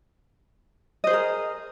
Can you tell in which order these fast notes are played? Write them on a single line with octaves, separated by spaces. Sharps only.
D#5 C5 G#4 A#4